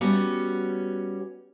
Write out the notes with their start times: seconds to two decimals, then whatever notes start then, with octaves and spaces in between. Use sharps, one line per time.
0.01 G3 B3 C#4 F#4